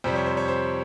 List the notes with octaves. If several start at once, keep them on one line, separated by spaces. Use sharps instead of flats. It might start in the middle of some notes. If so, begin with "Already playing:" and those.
F2 C3 G3 C5
C#5
C5
C#5
C5